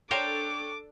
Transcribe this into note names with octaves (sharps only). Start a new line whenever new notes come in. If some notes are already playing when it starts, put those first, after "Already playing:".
D4 A4 A#4 C5 C#5 G5 A5 D6